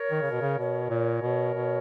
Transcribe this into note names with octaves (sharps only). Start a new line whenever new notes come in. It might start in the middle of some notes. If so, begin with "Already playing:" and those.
Already playing: A#4 C#5
D#3
C#3
B2
C#3
B2 A#4 C#5
A#2
B2
B2